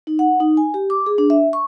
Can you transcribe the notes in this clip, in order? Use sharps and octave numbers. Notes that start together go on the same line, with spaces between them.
D#4
F#5
D#4
G#5
G4
D6
G#4
D4
E5
C#6